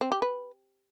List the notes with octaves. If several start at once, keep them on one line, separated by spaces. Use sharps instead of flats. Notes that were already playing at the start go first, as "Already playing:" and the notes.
C4
G4
B4